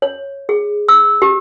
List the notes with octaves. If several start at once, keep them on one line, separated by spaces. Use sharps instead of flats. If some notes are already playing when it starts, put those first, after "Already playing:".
C#5
G#4
E6
G4